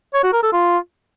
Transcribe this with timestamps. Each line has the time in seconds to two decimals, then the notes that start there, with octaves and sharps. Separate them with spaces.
0.14 C#5
0.24 F#4
0.33 A#4
0.43 A4
0.53 F4